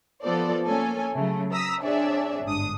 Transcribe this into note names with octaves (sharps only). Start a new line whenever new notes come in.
F3 B3 F4 A4 C5 D5
A#3 C#4 A4 C#5 G#5
C#3 F#3 A3
A#5 D#6 E6 B6
C4 D4 G#4 C#5 D5 E5
G1 G#2 D4 D#6